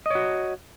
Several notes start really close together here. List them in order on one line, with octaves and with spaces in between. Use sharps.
D#5 C#5 F#4